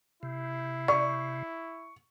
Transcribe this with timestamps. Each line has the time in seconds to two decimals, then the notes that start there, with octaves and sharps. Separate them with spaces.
0.23 C3 E4
0.88 D5 C#6